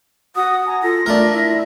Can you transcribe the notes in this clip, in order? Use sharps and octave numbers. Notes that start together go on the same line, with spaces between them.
F#4 F#5 D#6
G#5 A#5
F4 A4 A#6
A3 D4 F4 A#4 E5
E4